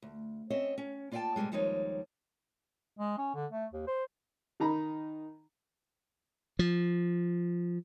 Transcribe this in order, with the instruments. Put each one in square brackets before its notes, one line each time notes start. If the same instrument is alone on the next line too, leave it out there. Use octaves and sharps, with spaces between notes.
[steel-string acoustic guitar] D2
C4 C#4 C#5 D#5 E5
C#4
A#3 F4 D5 E5 G5 A5
G#2 B2 D#3 G3 G#3
D#2 F3 G3 G#3 D#4 C#5
[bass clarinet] G#3
C#4
D3
A3
D#2
C5
[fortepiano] D#3 D#4 A#5 B5
[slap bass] F3